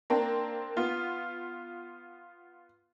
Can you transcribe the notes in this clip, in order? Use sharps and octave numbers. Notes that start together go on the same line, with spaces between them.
A#3 C4 D4
B3 F4